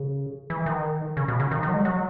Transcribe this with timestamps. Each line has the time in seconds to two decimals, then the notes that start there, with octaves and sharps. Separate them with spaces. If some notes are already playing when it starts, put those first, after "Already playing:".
Already playing: C#3
0.50 E3
0.66 D#3
1.17 C#3
1.28 B2
1.40 C#3
1.51 D#3
1.63 D#3
1.68 F#3
1.74 G#3
1.85 F#3